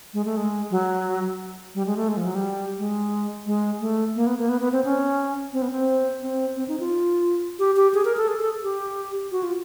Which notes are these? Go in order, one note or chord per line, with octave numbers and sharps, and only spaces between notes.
G#3
A3
G#3
F#3
G3
G#3
A3
G#3
F3
F#3
G3
G#3
G#3
A3
A#3
B3
A#3
B3
B3
C4
C#4
C4
B3
C4
C4
C4
D#4
F4
G4
G4
G#4
A#4
A4
G#4
A4
G4
F#4
F4